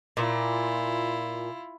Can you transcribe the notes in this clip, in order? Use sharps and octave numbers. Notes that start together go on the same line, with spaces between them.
A#2 E4 F4